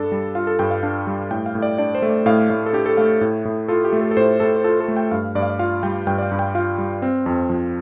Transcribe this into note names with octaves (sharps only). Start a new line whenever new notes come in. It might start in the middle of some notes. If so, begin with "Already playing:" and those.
Already playing: G2 D4 A4
G3
F4 F5
A4
G2 G5
F5
D4 F5
G3
A2 G5
F5
A2
D5
D4 D5
C5
A3
D5
A2 F5
A2 F5
A4
D4 G4
A4
A3 F5
A2
A2
F4 A4
G4
A3
A4
A4
A2 C5
A2 A4
C5
F4 A4
A4
A3
G5
G2 F5
G2 D5
F5
D5
F4 F5
G3 G5
G2 G5
D5
F5
G2
G5
F4 F5
G3
C4
F2
F3